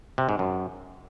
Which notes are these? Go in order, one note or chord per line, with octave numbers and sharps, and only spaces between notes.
C3
G#2
F#2